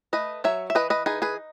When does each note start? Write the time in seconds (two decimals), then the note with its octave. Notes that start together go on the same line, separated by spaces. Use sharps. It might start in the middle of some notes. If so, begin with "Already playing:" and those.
0.13 A3 B4 D#5
0.44 F#3 C#5 E5
0.70 E5
0.75 E3 B4 D#5
0.90 B4 D#5
1.06 D#4 G#4 B4
1.22 G#4 B4